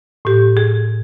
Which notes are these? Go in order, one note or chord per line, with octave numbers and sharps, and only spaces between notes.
A2 G4
G#4